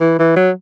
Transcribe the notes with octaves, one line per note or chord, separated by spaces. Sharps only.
E3
E3
F#3